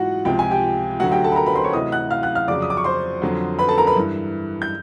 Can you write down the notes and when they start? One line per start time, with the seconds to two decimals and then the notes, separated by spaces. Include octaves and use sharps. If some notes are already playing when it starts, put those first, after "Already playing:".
Already playing: G#2 E3 F4 F#4 F#5
0.25 C#2 C3 F3 G5
0.39 G#5
0.51 G4 G5
1.00 D2 D3 F#3 F#4 F#5
1.12 G4 G5
1.24 A4 A5
1.32 B5
1.36 A#4 A#5
1.46 B4 B5
1.55 C5 C6
1.64 C#5 C#6
1.73 D2 C3 E3 D#5 D#6
1.92 F#5 F#6
2.10 F5 F6
2.23 F#5 F#6
2.35 F5 F6
2.48 F2 C#3 F#3 D5 D6
2.62 D#6
2.70 D6
2.77 C#6
2.84 C5 C6
3.22 F2 D3 F#3
3.59 B4 B5
3.68 A4 A5
3.78 A#4 A#5
3.87 B4 B5
3.96 G2 E3
4.62 G6